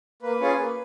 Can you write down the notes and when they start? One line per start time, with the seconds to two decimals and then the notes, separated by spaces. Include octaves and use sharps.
0.22 A#3 B4
0.40 C#4 F4 G#4
0.58 A#3